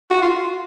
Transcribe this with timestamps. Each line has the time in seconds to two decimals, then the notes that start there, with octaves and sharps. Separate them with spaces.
0.10 F#4
0.22 F4